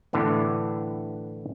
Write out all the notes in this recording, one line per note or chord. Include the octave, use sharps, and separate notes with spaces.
A2 D3 E3 B3